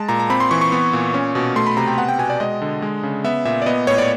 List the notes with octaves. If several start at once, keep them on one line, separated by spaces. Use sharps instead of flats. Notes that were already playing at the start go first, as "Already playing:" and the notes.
Already playing: G#3 A5
A#2 A#5
A#5
C4 B5
C6
E3 C#6
C#6
B3
A#2
C#4
B2
A3 C6
B5
C3 A#5
G5
B3 F#5
G5
B2 G#5
D5
G#3 D#5
D3
G#3
C#3
B3 E5
A#2 E5
D5
B3 D#5
A2 C#5
D5